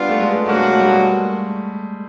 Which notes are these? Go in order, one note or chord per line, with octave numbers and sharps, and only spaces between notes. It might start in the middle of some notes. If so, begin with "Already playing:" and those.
Already playing: G3 B3 D4 F4
A3
G#3
G#3
B2 F#3 A3 A#3 D4 F#4
G#3
A3
G3
G#3